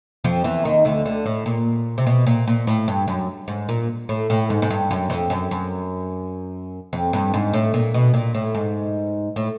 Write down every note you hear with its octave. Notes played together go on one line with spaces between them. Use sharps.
F2 F3
E2 E3
D#2 D#3
D2 D3
D2 D3
A2
A#2
C3
B2
A#2
A#2
A2
G2
F#2
G#2
A#2
A2
A2
G#2
G#2
G2
F#2
F2
F#2
F#2
F2
G2
G#2
A2
A#2
B2
A#2
A2
G#2
A2